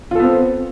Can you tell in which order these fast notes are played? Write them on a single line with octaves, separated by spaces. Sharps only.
F4 A4 B3 C4